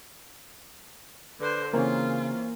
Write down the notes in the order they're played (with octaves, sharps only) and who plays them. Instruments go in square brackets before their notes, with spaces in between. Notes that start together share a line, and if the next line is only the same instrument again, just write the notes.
[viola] D3 C5 [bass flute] B4
[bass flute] C#3 [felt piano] E3 C4 C#4 [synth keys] A#3 [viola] F4